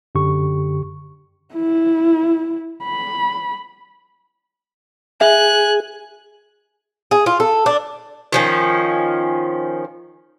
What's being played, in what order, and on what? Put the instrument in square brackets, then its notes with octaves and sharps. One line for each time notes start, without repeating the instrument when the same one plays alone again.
[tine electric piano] F#2 D3 G4 C#6
[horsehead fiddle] E4
B5
[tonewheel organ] G#4 [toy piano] E5 [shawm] G#5 [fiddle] F#6
[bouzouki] G#4
F4
A4
D4
D#3 F3 C#4